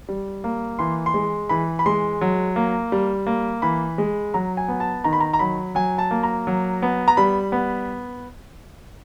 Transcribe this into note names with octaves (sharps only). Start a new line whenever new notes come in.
G3
A#3
E3 C6
C6
G#3
E3 B5
B5
G#3 C6
F#3
A#3
G3
A#3
E3 B5
G#3
F#3 A#5
G#5
B3
A5
D#3 A#5
B5
A#5
A#5
F#3 B5
F#3 G#5
A5
A#3
A#5
F#3
B3
A#5
G3 B5
B3